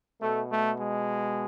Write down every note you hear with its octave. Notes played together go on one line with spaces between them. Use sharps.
B2 A3
A3
G#3